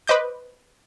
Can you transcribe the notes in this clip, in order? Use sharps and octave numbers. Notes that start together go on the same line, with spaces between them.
B4 C5 D#5 D6 G6